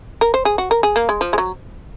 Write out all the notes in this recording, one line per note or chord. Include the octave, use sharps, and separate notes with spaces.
A#4
C5
G#4
F#4
A#4
G#4
A#3
G#3
F3
G#3
F#3